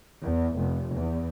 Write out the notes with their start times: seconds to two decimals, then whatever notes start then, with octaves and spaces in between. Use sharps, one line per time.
0.23 E2
0.57 F1
0.94 E2